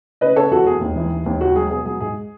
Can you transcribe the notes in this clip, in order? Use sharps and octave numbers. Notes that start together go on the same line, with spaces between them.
C#3 B4 D#5
C#3 A4 C#5
E2 F#4 A4
E2 G#4
D#2
E3
D#2
D#2
C#2 F#4
F#3 G#4
B2 G#4
F#3 G#4
G#2 G#4